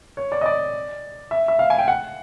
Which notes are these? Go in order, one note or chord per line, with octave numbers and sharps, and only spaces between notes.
C#5
D5
D#5
D5
E5
E5
F5
G#5
G5
F#5